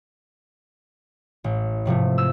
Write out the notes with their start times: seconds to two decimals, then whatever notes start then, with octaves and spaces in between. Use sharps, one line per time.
1.44 A1
1.85 G#2 C3 F3 A3
2.18 E6